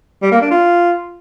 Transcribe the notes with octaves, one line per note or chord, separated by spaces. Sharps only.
G3
A#3
D4
F4